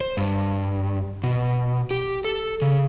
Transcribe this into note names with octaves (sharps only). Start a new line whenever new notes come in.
C5
G2
B2
G4
A4
C#3